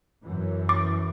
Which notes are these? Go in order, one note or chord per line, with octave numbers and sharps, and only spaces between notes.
F#2 E3
D6